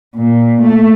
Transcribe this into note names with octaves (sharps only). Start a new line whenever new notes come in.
A#2
A3